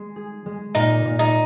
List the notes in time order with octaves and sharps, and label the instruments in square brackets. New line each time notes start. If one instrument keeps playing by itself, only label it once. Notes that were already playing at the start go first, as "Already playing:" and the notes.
Already playing: [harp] G#3
G#4
G#3
[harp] A#2 [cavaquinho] D#4
[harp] A#2
[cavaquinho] D#4